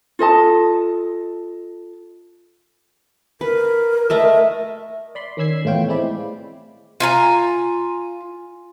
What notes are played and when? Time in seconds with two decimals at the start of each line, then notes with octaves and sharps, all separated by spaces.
0.19 F4 A4 D#5 A5
3.41 A#4 B4
4.10 A3 D#5 E5
5.15 D5 B5 C6
5.37 D#3 C#4 B5 E6 G#6 C7
5.65 A2 E3 B3 F4 C#5 G5
5.89 G#3 C4 E4 D5 B5
7.00 F4 G#5 A#5